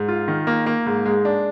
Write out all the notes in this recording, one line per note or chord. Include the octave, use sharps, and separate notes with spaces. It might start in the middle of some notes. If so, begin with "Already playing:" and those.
Already playing: G#2
F4
D#3
A#3
A#3
G#2
G#3
D4